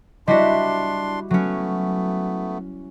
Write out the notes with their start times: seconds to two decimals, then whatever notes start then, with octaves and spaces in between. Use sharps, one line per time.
0.28 G3 D4 E4 F#4 D5 D#5 C6
1.31 F#3 A3 B3 C#4